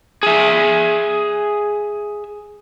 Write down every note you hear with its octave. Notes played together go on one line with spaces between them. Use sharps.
G#4 E5